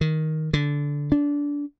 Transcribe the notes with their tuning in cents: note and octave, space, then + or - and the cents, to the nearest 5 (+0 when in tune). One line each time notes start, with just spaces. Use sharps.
D#3 +10
D3 -15
D4 -20